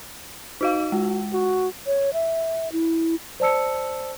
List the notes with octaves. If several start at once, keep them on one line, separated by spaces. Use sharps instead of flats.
D#4 F#4 F5
G#3 F#4
F#4
C#5
E5
E4
C5 D5 A5 E6 C#7